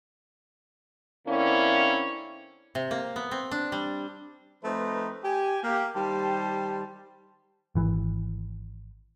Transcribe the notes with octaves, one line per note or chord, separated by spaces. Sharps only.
D3 A#3 C4 C#4 E4
C3
A#3
B3
C4
D4
G3
F3 A3 C4 D#4 B4
G4 G#5
A#3 G4
D#3 G3 G4 C5 A5
G#1 E3